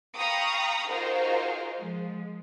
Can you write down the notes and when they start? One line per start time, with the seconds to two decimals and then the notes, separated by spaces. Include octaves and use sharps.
0.17 F5 G5 A#5 B5 C#6 D#6
0.89 D#4 F4 F#4 G#4 A#4 C5
1.79 F3 G#3